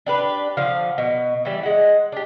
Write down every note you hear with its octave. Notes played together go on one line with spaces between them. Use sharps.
D4 G4 B4
D3 F3 F5
B2
E3 G3
G#3 F#5
D4 G4